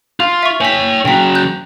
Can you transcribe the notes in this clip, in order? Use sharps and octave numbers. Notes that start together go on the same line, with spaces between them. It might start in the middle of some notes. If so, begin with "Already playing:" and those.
F4 F5
E5 C#6
C#5 G5 G#5 B6
C#3 F#3 G5 B6
F#6 G6